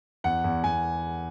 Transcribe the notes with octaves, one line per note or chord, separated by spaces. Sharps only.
E2 F#5
E2
E2 G#5